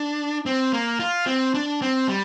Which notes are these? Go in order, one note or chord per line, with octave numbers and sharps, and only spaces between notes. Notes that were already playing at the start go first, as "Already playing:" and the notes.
Already playing: D4
C4
A#3
F4
C4
D4
C4
G3